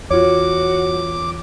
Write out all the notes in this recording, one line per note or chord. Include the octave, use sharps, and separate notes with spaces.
E2 F4 F#4 C#5 D6